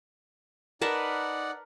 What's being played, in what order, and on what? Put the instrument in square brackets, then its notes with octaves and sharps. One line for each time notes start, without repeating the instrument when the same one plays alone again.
[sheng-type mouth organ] D#4 D5 F#5 [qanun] A#4 B4 A5